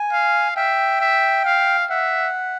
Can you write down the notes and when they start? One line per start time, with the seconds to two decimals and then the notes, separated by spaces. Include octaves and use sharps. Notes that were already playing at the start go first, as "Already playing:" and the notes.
Already playing: G#5
0.12 F5
0.56 E5 G5
1.00 E5
1.45 F5
1.90 E5 F#5